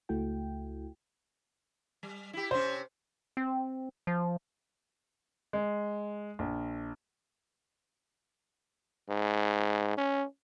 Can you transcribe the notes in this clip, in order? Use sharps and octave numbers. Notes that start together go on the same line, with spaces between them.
C#2 A3 E4 F#4 G5
G3
E4 G4
C3 C4 C#4 C5
C4
F3
G#3
A#1
G#2
C#4